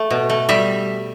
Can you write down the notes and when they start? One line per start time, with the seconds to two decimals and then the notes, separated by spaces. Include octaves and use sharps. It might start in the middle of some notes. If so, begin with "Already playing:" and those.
Already playing: A3
0.10 B2
0.30 A3
0.49 G3 E5